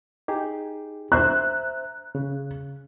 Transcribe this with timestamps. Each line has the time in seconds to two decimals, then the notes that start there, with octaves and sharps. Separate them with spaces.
0.28 D#4 G4 G#4
1.12 C5 E5 A#5 F#6
2.15 C#3